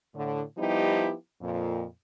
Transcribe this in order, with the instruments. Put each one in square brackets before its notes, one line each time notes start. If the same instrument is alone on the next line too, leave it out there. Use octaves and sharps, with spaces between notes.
[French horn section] A2 D3
F3 G3 B3 D#4 E4 G4
F2 A#2